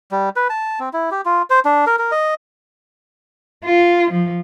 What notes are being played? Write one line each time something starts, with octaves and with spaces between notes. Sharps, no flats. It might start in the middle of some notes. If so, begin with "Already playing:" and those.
G3
B4
A5
C4
E4
G4
F4
C5
D4
A#4
A#4
D#5
F4
F3